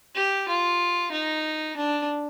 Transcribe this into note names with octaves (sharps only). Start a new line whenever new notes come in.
G4
F4
D#4
D4